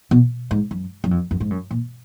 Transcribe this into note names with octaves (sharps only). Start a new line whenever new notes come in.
B2
G#2
F#2
F#2
F2
F#2
G#2
F#2
A#2